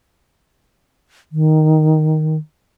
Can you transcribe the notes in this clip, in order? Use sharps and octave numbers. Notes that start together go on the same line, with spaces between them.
D#3